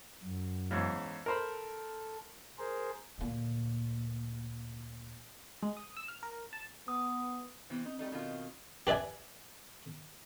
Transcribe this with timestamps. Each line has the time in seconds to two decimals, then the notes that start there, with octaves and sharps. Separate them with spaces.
0.23 F#2
0.71 E2 G#2 C#3
1.26 A4 A#4 C5 B5
2.58 G#4 A#4 C5
3.18 D2 A#2
5.63 G#3
5.77 D#6
5.97 E6
6.08 F6
6.23 A#4
6.53 A5
6.88 B3 D#6
7.70 C3 E3 B3 C4
7.85 C4 D#4
7.99 G3 A3 D#4
8.12 B2 D#3 F4
8.87 G4 B4 D5 E5 G#5